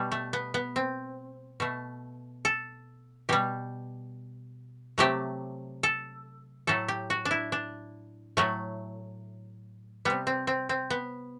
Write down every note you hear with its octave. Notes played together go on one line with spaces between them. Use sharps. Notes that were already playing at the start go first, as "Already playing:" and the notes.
Already playing: B2 G3
A3
B3
B3
C4
B2 A3
A4
B2 G3 G4
C3 F#3 A3 G4
A4
A2 F#3 A3 A4
G4
F#4
D4
E4
D4
A2 F#3 A3
C3 G3 B3
C4
C4
C4
B3